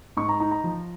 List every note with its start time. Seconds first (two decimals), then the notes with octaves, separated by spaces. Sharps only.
0.17 G#2 C#6
0.29 A#5
0.40 D#4 A#5
0.51 A#5
0.64 F3